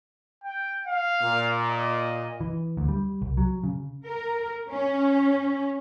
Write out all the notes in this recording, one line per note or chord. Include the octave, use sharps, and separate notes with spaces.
G5
F5
A#2
D#5
E3
D2
G3
C2
F#3
C#3
A#4
C#4